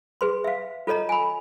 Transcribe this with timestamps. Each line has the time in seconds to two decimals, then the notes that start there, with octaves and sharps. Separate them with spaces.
0.21 G#4 B4 C6
0.44 E5 F5
0.87 F4 A4 C#5 D#5 A#5
1.09 G#5 B5